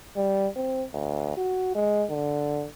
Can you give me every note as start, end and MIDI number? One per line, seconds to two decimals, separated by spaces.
0.17 0.47 55
0.56 0.84 60
0.94 1.35 38
1.37 1.75 66
1.75 2.04 56
2.10 2.66 50